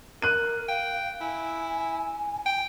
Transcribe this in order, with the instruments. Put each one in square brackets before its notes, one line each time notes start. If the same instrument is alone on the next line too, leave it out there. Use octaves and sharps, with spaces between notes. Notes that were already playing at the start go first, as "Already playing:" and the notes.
[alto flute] A#4 [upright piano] F#6 D#7
[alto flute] F5 [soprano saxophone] G5
[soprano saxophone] E4 [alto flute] G#5
[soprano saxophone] G5